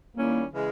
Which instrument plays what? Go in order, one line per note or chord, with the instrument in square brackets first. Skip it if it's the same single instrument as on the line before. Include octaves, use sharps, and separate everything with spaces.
[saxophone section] D#3 G3 C#4 E4 [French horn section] A#3
[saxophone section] C#3 E3 G#3